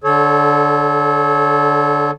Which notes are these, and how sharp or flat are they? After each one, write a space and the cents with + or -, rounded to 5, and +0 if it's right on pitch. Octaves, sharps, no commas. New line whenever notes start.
D3 +0 A4 -30 C#5 -10